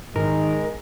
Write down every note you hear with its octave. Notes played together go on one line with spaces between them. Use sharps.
G#2 D#3 G#3 A#4